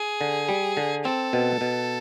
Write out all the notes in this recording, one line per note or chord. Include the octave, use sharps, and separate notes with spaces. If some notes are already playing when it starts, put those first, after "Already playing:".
Already playing: G#4
D3
G3
D3
C4 A4
B2
B2